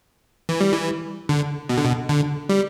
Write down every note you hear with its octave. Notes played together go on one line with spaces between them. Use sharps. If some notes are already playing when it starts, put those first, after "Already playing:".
E3
G3
E3
D3
B2
D3
B2
D3
G3